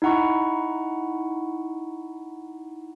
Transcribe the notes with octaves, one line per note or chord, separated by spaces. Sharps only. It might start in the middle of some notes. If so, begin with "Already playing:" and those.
D#4 E4 F#5 A#5 C#6